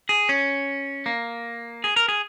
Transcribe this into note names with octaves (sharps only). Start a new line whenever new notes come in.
G#4
C#4
A#3
G#4
A#4
G#4